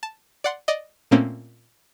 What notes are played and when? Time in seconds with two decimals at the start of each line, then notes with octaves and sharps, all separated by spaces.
0.03 A5
0.44 D5 F#5 C6
0.68 D5 D#5
1.11 A#2 A3 A#3 C4 C#4